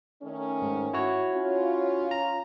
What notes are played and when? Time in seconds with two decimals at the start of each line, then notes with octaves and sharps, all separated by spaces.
0.22 D#3 A3 C#4
0.62 G#2
0.93 E4 F#4 C#5
1.34 C#4 F4
2.11 A#5